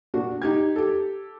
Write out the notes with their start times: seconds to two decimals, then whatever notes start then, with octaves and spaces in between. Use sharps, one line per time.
0.14 A#2 D4 F#4
0.42 D#4 G4 G#6
0.76 G4 A4